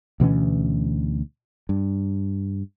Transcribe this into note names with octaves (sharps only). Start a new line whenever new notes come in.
D2 B2 E3 C#4
G2